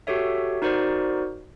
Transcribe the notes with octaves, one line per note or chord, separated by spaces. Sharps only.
F#4 G4 A4 C#5 E5
D#4 F#4 A#4 C5 D5